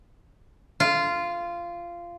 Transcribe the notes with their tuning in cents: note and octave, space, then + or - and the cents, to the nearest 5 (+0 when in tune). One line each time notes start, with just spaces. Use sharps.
F4 -15